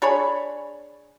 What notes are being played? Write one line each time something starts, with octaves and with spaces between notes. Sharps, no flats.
D4 G#4 C#5 B5